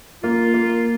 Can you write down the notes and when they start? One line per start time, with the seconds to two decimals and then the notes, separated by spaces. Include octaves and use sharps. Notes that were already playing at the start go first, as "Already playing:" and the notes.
0.23 A#3 F4
0.54 A#3